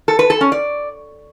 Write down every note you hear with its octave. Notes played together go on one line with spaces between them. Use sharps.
A4
B4
A4
C#4
D5